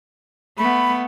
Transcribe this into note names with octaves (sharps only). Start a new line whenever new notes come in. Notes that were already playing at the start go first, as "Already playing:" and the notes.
A3 B3 B5